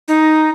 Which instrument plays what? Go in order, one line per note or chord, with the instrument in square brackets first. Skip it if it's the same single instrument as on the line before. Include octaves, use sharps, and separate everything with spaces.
[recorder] D#4